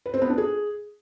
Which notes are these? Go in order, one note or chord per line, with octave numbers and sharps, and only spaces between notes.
B4
C4
B3
D4
G#4